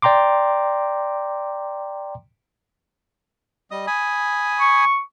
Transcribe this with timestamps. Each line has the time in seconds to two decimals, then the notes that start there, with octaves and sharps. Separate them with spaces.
0.02 D5 G5 A#5 C6 D6
3.71 G3 D#5 D#6
3.87 G#5 B5 D#6
4.59 C#6